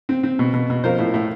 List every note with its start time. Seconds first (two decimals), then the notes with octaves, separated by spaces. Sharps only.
0.09 C4
0.23 C4
0.39 B2
0.54 B2
0.70 B2
0.84 F3 A#4 C5
0.99 A2
1.14 A2